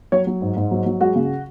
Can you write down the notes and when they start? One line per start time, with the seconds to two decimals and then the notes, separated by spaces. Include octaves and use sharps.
0.12 F#3 C#5
0.27 F#3
0.42 G#2
0.56 G#2
0.71 F#3
0.86 F#3
1.00 G#3 F#4
1.15 C#3